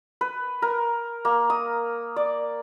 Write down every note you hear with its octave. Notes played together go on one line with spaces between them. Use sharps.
B4
A#4
A#3
D#6
D5